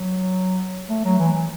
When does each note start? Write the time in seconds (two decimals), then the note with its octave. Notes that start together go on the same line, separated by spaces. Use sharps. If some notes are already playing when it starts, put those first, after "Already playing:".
Already playing: F#3
0.89 A3
1.05 F#3
1.19 E3
1.35 E3